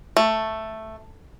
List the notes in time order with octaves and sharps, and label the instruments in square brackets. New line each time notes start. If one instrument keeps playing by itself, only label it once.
[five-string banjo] A3